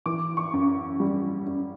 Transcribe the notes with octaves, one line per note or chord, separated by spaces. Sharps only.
E3 D6
C#6
F#2
G3
F#2